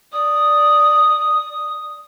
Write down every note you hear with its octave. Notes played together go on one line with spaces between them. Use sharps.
D5 D#6